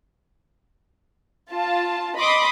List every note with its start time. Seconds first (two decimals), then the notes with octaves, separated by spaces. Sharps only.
1.53 F4 A5
2.17 D#5 B5 C6 D6 D#6